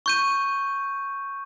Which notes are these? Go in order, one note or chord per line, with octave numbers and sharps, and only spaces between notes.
C#6 G6 D#7